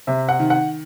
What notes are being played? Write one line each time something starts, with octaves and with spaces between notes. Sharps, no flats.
C3 E5
F#5
D#3
F#5